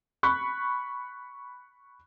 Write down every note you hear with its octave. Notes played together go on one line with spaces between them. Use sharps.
B5 C#6 F#6